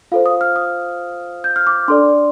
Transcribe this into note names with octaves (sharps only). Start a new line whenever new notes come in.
F4 A4 C5 F5
D#6
F6
D#6
G6
F6
D6
D4 A4 D5 C6